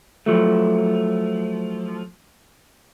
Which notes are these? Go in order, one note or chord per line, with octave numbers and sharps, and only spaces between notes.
F3 F#3 A3